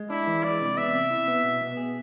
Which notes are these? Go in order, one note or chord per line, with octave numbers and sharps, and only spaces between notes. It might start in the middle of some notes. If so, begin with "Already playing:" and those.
Already playing: G#3
D4 E4
E3
G#3 D5
C3
B3 E5
C3
E4
B3
B2
B3
G#4